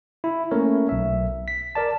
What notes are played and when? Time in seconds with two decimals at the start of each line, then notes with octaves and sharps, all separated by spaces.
0.24 E4
0.51 A3 A#3 C#4 A#4 C#5
0.89 B1 E5
1.48 B6
1.75 A#4 D5 A5